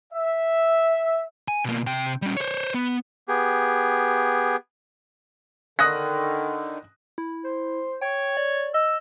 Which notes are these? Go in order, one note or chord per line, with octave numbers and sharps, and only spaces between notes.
E5
G#5
B2 A#3
C3 G5
G3 C#4
C5 C#5
B3
B3 G4 G#4
D3 D#3 D#6 F#6 A#6
E4
C5
C#5 G5
D5
D#5 E6